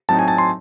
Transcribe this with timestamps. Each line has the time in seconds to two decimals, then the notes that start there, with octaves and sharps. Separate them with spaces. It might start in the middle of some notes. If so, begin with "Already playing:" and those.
0.09 A2 F#3 C4 D#4 A5
0.19 G#5
0.28 A5
0.38 C6